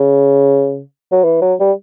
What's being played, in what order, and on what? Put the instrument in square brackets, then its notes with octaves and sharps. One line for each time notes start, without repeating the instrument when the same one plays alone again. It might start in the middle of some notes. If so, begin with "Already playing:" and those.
Already playing: [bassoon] C#3
F#3
E3
F#3
G3